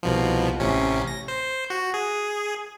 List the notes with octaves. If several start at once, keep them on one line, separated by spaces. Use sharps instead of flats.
C2 B2 F3
A1 C3 C#4
A#6
C5
F#4
G#4